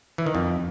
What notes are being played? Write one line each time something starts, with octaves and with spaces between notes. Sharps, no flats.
E3
D#3
F2